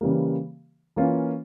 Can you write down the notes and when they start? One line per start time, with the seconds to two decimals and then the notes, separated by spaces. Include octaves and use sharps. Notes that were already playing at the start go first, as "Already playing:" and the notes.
0.01 C#3 E3 G3 A#3
0.96 E3 A#3 C#4 F4